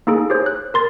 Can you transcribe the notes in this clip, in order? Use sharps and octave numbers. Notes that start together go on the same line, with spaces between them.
A#3 D#4 G#4 A4
G4 G#4 C5 C#5
F#6
A#4 C6 A6